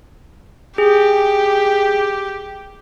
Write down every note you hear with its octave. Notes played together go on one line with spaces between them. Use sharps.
G4 G#4